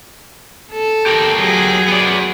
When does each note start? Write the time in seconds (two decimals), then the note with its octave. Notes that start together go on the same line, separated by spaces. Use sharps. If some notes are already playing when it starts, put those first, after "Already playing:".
0.72 A4
1.06 G4 A#4
1.36 F#3 G#4
1.88 B3 D5